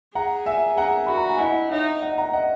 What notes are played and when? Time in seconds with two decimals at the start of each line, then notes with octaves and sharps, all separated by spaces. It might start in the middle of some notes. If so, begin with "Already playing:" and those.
0.15 G#4 F#5 A#5
0.46 E5 G#5
0.77 G#4 F#5 A#5
1.07 F#4 B5
1.17 A#5
1.29 G#5
1.39 E4 D#5 F#5
1.71 D#4 C#5 E5
2.02 D#5 F#5
2.18 F#5 A#5
2.33 D#5 F#5